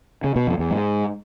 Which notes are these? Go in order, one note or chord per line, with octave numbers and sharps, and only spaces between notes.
C#3
B2
F2
E2
G#2